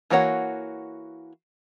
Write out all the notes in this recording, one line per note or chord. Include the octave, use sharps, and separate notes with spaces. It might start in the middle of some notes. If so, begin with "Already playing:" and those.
E3 A#3 F#4 C#5 F#5